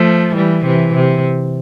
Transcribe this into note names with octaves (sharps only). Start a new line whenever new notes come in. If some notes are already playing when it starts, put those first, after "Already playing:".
Already playing: F3 A3
E3 G3
C3 E3
C3